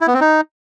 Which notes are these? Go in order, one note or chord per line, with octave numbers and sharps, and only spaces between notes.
E4
B3
C4
D#4